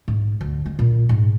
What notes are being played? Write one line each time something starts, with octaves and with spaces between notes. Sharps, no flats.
G#2
D2
G#3
A#2
G#2